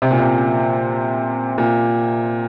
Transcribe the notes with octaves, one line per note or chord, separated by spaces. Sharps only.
C3
A#2
C3
A#2